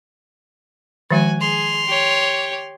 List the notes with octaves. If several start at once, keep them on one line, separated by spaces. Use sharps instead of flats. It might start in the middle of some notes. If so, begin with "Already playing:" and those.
D#3 F3 G#3 F#4 G#5
G#4 C6 F7
G4 C#5